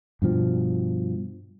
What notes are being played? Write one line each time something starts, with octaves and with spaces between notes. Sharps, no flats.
G2 B2 F3